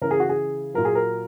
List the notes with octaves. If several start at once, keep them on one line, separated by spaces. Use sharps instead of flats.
C#3 E3 A#4
G#4
F#4
G#4
A#2 F#3 A#4
G#4
A#4